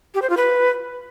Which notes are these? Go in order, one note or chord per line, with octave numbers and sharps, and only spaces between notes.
G4
C5
F4
B4